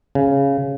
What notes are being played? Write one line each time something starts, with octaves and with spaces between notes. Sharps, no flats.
C#3